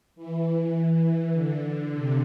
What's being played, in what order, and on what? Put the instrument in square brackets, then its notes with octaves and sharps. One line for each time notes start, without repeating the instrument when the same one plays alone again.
[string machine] E3
D3
C3